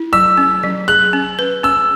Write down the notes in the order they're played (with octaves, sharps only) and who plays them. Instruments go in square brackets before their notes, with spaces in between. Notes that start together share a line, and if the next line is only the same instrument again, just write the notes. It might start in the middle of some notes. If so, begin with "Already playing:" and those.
Already playing: [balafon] E4
[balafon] F#3 [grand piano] E6
[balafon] C#4
F#3
[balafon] G#4 [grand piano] F#6
[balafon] C#4
B4
[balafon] C#4 [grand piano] E6